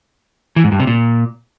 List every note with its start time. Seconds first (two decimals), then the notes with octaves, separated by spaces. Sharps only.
0.56 E3
0.64 G#2
0.72 G2
0.80 C3
0.87 A#2